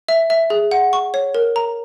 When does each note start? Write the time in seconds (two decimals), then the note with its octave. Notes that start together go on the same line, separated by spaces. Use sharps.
0.09 E5
0.30 E5
0.50 G#4
0.71 F#5
0.93 C#6
1.14 C#5
1.35 A#4
1.56 A#5